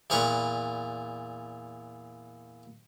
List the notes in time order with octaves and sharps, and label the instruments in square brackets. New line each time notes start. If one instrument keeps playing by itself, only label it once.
[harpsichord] E2 A#2 A#4 B4 C#6 D6